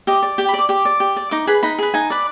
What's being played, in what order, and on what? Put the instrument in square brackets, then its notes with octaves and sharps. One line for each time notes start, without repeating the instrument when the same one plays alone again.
[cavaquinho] G4 D#5
D5
G4 G5
B5
D5
D6
G4 D6
D5
G4
D5
D#4 D6
G#4 B4 B5
D#4 B5
G#4 B4
D#4 G#5
B4 D5